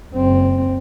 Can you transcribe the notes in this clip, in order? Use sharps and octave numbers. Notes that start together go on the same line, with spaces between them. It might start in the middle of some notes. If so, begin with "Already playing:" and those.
F#1 C4